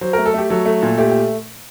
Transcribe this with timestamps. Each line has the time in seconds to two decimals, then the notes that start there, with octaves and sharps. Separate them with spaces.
0.01 F#3 C5
0.13 A3 A#4
0.26 A4
0.34 A3 G4
0.50 F#3 A4
0.65 A3
0.83 A#2
0.98 A3 G4
1.10 G4